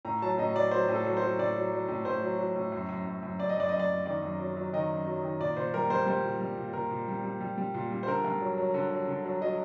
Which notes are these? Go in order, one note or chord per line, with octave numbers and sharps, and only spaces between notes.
A2 A#5
F#3 A5
A2 D#5
F#3 D5
F#3 C5
A2
A4
F#3
C5
F#3
A2 D5
F#3
F#3
A2
A2 C5
F#3
F#3
A2
F#2
F#2
F#2
F#2
F#2 D5
D#5
F#2 D5
F#2 D#5
D5
F#2
D#3 D5
F#2
F#3
F#3
D#3 D#5
F#2
F#3
D#3
A#2 D5
A#2 C5
G3 A#4
G3 C5
G3 C5
A#2
G3
A#2
A#2 A#4
A#2
G3
G3
G3
G3
A#2
G3
C5
D3 A#4
G2
F#3
F#3
D3
F#3
D3
F#3
F#3 D#5